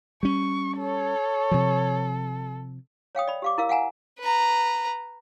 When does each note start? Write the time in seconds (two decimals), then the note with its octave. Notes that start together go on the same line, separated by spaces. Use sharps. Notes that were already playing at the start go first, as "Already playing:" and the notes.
0.23 G3 C#4 C#6
0.79 A4 C#5
1.51 C3 F3
3.15 C#5 F5 G5 D#6
3.28 D5 B5
3.42 G4 F5 D6
3.58 E4 A#4 F5 E6
3.69 F5 F#5 G#5 A#5
4.19 B4 A#5